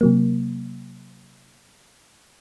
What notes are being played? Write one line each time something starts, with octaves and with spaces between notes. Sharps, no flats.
C3 F#3 A#3